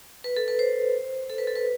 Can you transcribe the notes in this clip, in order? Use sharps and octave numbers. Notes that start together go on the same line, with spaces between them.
B4
A4
B4
C5
A4
B4
A4
B4